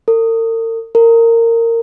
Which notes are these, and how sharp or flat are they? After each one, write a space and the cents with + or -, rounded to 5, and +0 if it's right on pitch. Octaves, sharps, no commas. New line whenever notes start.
A#4 -45
A#4 -20